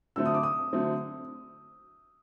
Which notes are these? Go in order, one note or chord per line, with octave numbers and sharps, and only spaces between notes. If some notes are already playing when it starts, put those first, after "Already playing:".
D3 F#3 A3 C4 E6
D#6
D6
D#6
D3 F#3 A3 C4